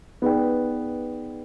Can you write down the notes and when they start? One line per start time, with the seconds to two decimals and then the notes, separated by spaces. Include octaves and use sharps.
0.22 B3 D#4 G#4 B4 D5 G5